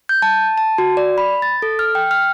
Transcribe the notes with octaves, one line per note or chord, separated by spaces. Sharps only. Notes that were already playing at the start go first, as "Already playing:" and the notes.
G6
A5
A5
F#4
D5
B5
A6
A4
F6
G5
F6